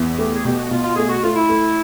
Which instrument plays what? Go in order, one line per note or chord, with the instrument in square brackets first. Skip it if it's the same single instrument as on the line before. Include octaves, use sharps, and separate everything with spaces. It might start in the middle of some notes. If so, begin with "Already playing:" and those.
Already playing: [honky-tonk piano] E2
[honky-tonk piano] A3 [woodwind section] G4
[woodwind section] G#4
[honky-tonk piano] B2 [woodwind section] G4
[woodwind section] F#4
[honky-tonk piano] B2 [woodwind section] F4
[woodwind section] F4
[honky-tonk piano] A3 [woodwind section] G#4
[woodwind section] F#4
[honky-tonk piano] A3 [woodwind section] F4
[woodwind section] E4
[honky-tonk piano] A3